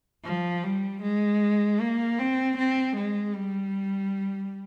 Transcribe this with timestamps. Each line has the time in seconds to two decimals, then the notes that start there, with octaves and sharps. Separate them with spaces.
0.25 F3
0.64 G3
1.03 G#3
1.81 A#3
2.19 C4
2.58 C4
2.97 G#3
3.35 G3